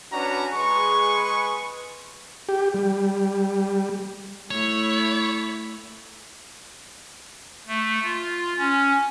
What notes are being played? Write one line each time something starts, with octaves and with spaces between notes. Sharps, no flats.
C#4 D4 F#4 B4 A#5
G#3 G#4 B4 C#6
G4
G3
A3 E4 C#5
A3
F4
C#4